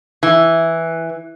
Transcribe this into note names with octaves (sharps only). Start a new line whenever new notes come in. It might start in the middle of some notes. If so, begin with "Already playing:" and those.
E3